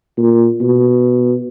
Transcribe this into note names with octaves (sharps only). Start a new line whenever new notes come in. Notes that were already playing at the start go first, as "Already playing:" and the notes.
A#2
B2